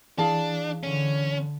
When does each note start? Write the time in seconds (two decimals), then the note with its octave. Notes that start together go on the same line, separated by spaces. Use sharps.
0.18 E3 D4 G#4 F5 A5
0.83 D3 C#4